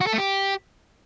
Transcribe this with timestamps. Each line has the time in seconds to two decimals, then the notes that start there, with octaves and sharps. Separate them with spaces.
0.01 F#4
0.07 A4
0.12 A3
0.18 G4